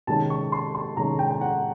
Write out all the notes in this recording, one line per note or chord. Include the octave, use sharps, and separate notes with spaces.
C3 D#3 G#3 C#4 A5
C#6
C6
C6
C3 D#3 G#3 C#4 A#5
G5
G5
F#5